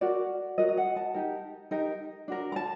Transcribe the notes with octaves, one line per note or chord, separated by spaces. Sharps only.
F#4 A#4 D5
F#4 A#4 D#5
D#5
F#5
A5
D#4 G4 A#4
D#4 G4 A#4
D4 F#4 A#4
A#5
A5